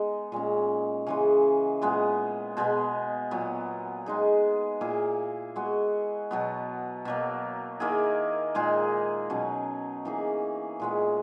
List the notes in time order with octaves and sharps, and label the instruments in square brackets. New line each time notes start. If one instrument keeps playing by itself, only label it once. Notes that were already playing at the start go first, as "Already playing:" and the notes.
Already playing: [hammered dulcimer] G#3 B3 D#4
A#2 G#3 C#4
C#3 E3 G#3
A#2 G#3 B3
B2 G#3 B3
A#2 F#3 B3
G#3 D#4 G#4
A#2 A#3 E4 G#4
G#3 B3 F#4
B2 F#3 B3
B2 F#3 A#3
D#3 A#3 E4 G#4
A#2 G#3 D#4 G#4
B2 F#3 C#4
E3 A#3 D#4 G#4
A#2 G#3 B3